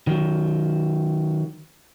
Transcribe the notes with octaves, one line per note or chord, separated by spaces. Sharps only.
D#3 F#3